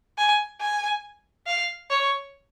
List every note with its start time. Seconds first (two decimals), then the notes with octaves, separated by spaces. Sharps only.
0.18 G#5
0.61 G#5
1.47 F5
1.90 C#5